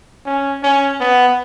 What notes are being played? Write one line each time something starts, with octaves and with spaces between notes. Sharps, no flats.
C#4
C#4
B3